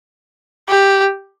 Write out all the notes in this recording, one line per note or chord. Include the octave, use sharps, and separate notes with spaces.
G4